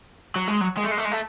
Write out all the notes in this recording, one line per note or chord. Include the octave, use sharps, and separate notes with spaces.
F#3
G#3
F#3
G#3
A3
G#3
A3
G#3
A3